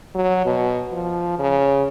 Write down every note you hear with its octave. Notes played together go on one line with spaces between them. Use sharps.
F#3
B2
F3
C#3